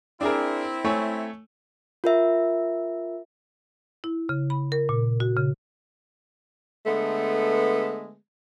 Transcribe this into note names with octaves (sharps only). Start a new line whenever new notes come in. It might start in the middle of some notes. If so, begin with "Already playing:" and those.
C4 D4 E4 G#4 A#4
A3 C#5 G#5
F4 A#4 E5
E4
C#3
B5
A#4
A#2
F#4
C#3
D3 G#3 A3 B3